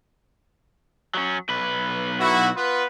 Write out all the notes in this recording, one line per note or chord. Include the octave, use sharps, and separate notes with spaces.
F#3 C#4
B1 B4
E4 F#4
B3 F4 B4